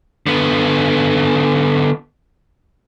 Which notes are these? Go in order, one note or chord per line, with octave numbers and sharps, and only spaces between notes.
D3 B3